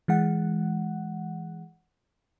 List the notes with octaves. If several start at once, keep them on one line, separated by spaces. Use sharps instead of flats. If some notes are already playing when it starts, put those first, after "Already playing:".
E3 G#3 F#5